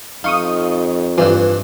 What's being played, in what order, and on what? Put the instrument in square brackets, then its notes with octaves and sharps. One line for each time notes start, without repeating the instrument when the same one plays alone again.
[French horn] F2 [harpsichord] D#4 [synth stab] F5 C#6 D#6
[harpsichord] G2 E3 [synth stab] G3 F4